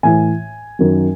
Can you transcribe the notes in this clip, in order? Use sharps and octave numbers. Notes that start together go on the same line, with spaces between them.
A2 E3 G#5
F#2 D#3 F#3